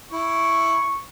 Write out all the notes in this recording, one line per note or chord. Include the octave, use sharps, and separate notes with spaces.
E4 C#6